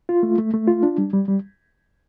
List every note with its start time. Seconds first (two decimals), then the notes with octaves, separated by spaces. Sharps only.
0.09 F4
0.23 A3
0.38 A3
0.54 A3
0.68 F4
0.83 D4
0.98 G3
1.13 G3
1.28 G3